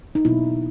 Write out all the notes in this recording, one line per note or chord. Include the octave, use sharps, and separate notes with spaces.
D#4
B2 F#3 A#3 E4